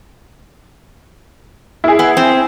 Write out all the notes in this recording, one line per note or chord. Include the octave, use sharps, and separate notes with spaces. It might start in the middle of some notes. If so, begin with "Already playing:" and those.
E4 G#4
B3
C4